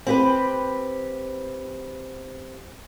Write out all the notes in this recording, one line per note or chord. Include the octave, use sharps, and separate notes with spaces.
C4 G4 B4